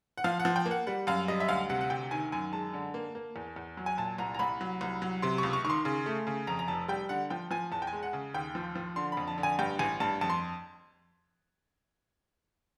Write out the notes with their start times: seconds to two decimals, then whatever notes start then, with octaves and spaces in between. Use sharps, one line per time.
0.18 F#5
0.24 F3 F5
0.40 F#5
0.45 F3
0.56 G5
0.66 A#3
0.71 F#5
0.87 G3 F#5
1.07 F#2 F5
1.28 G3 D#5
1.40 E5
1.48 D2 F5
1.70 C3 F#5
1.81 F#5
1.90 D2 G5
2.11 D#3 G#5
2.32 F#2 G#5
2.52 G#3 A5
2.74 D3
2.94 A#3
3.15 A#3
3.36 E2
3.56 E2
3.77 F#3
3.86 G#5
3.98 A#2 A5
4.18 C2 A#5
4.35 A#5
4.39 C2 B5
4.61 F#3
4.81 C2
5.02 F#3
5.22 C3 C6
5.38 C#2 C#6
5.53 C#6
5.64 D#3 C#6
5.70 C6
5.85 C#3
6.06 A3
6.27 C#3
6.47 F2 A#5
6.59 A#5
6.68 F1 A5
6.88 G3 G5
7.09 D3 F#5
7.30 F3 G5
7.51 F3 G#5
7.72 E2 A5
7.82 G5
7.87 G#5
7.93 G#3
8.03 F#5
8.13 C#3
8.34 D#2 G5
8.55 F3
8.76 F3
8.96 D3 C6
9.12 B5
9.17 F2
9.27 A5
9.38 D3
9.43 G#5
9.59 G2 G5
9.79 A1 G#5
10.00 G2 A5
10.21 F2 A5
10.30 C6